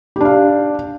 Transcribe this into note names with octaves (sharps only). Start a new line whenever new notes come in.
D4 G4 F5